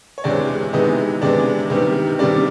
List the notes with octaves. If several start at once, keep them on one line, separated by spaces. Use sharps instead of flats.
C#5
E2 C3 E3 G#3 D4 D5
C3 E3 G#3 B3 D#4 D#5
C3 E3 G#3 B3 D4 D5
C3 D#3 G3 B3
C3 D#3 G3 B3 D4 D5